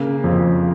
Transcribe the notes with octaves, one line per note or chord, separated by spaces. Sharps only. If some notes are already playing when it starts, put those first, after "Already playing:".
Already playing: C#3 A#3
F2